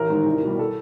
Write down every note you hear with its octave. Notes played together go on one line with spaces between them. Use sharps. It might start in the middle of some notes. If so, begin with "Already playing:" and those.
Already playing: A1 A#4
G#2 D#3
C2
B2 G3
A4